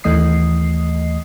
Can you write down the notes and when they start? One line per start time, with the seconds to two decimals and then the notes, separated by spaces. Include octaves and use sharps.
0.04 D#2 E3 A3 D#5 D#6 C7